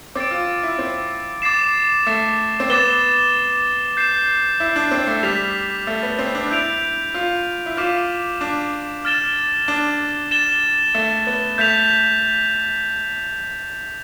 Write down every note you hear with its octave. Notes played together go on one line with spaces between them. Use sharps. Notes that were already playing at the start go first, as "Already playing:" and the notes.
C4 D6 A6 D7
F4
E4
C4
D6 A6 C7 E7
A3
C4
B3 D6 A6 E7 G7
G6 C7 E7
E4
D4
C4
A3
G3 F6 B6 F7
A3
B3
C4
D4
E4 G6 D7 F7
F4
E4
F4 D6 F6 B6 E7
D4
F6 A6 E7 G7
D4
A6 E7 G7
A3
B3
A3 G6 B6 F7